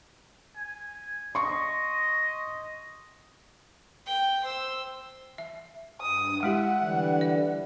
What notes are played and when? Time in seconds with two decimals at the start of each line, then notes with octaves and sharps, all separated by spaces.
0.56 G#5
1.35 D#5 C6 C#6
4.06 G5
4.45 C5 E6
5.38 E5
6.02 G2 D#6
6.43 G#3 E4 G4 E5 F#5
6.80 D3 E3 G3
7.21 D5